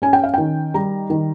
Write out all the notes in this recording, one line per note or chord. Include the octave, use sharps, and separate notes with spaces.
C#4 G#5
G5
F5
D#3 G5
G3 A#5
D#3